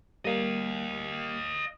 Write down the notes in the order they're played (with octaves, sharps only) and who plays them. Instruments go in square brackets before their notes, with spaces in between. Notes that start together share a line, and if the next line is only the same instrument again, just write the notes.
[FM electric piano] G3 A#3 [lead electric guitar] D#5 F5